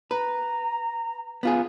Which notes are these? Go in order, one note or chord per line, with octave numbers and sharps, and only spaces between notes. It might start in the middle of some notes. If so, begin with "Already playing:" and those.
B4 A#5
B3 F4 G#4